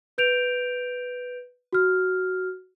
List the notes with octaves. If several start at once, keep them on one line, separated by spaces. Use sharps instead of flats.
B4 G6 D7 F7
F#4 F6